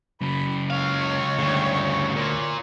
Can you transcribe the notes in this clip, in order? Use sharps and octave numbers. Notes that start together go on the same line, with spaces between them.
C#3 F#3 B5
C#2 C#5 F5
D2 G2 C#3
A#2